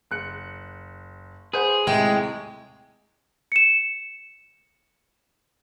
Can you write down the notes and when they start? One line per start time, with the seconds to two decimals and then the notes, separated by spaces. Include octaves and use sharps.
0.11 F#1 F#6 C#7
1.53 G#4 B4 C5 F#5
1.87 D#2 A2 C3 G#3 G5
3.52 C#7 E7